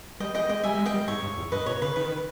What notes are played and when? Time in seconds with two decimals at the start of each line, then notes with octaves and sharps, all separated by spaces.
0.20 G3 D#5 G5
0.35 E3 D#5 G5
0.49 G#3 D#5 G5
0.64 G3 E5 G#5
0.75 G3
0.79 G#3
0.86 D#5 G5
0.94 G3
1.08 G#2 C#5 E5
1.23 G2
1.38 E2
1.52 G2 B4 D#5
1.66 A#2 C#5
1.81 C#3 B4
1.96 D#3 B4